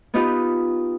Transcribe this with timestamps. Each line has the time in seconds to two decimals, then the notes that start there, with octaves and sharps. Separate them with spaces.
0.14 B3 D#4 F4 G4 B4